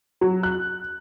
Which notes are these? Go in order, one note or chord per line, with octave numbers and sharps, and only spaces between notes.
F#3
F#6